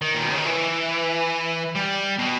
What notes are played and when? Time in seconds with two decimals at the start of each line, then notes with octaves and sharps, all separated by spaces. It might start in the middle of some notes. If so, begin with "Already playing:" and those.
0.02 D#3
0.15 A#2
0.22 B2
0.30 C#3
0.38 D#3
0.46 E3
1.76 G3
2.19 B2